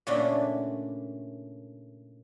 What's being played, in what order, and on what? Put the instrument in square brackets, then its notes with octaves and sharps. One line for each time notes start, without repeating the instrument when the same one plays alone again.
[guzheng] A#2 C#3 A3 D4 E4 F#4